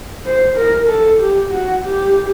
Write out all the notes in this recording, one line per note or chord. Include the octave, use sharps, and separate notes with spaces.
C5
A#4
A4
G4
F#4
G4